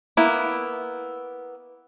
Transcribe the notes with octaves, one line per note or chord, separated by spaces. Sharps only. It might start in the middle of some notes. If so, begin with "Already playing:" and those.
A#3 B3 E4